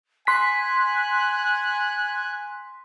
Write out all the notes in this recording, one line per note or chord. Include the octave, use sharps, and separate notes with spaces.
G#5 C6 F#6 B6